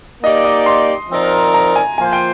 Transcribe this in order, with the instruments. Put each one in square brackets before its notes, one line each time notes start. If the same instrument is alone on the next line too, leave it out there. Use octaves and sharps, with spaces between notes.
[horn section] A#3 D#4 G4 D5 [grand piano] D#5
[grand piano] D#5
C6
[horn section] F3 C4 D#4 A#4 D5
[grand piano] A#5
G#5
[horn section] F3 A#3 F4 C5 [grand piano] G#5
[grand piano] G5